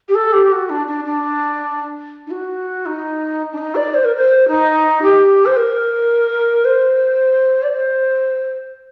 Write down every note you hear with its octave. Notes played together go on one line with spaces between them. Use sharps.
G4
A4
G4
F#4
D4
D4
D4
D#4
F#4
D#4
D4
D#4
D5
C5
A#4
C5
D#4
G4
C5
A#4
C5
D5
C5